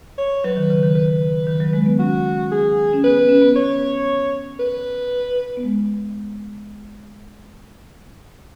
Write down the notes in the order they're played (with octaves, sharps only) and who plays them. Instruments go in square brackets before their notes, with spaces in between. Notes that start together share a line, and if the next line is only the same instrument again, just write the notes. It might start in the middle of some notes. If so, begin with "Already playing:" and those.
[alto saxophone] C#5
[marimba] F#3 [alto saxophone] B4
[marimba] D#3
C#3
D#3
[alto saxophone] B4
[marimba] D#3
F#3
G#3
B3
[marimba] C#4 [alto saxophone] F#4
[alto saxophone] G#4
[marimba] C#4
[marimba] B3 [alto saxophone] B4
[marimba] B3
C#4
B3
[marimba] B3 [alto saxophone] C#5
[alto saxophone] B4
[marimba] B3
G#3